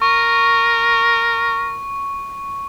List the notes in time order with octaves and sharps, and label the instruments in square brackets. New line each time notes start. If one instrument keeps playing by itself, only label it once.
[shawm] A#4 [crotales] C#6